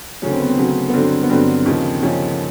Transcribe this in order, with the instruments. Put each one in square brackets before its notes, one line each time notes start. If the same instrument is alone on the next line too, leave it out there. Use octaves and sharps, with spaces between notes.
[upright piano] D2 C#3 F#3 C#4
C4
B3
C4
D2 C#3 F#3
B3
G2 D3 F#3 C4
B3
G2 D3 F#3 C4
D#2 C#3 F3
D#2 C#3 F3 C#4